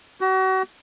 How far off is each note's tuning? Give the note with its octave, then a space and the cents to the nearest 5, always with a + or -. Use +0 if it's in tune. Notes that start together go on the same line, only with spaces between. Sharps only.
F#4 +35